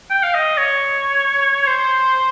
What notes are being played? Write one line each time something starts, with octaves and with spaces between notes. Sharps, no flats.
G5
F5
D#5
C#5
C5